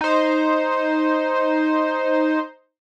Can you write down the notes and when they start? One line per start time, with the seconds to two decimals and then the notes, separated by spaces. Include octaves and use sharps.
0.01 D#4 C5